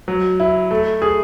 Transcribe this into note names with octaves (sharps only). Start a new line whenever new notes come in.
F#3
E4
A3
G#4